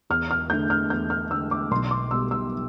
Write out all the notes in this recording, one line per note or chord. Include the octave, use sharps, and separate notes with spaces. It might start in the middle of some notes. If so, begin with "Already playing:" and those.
E2 F6
F6
D3 A3 G6
F6
E2 G6
F6
D3 A3 E6
D6
B1 C6
D6
B2 G3 E6
E6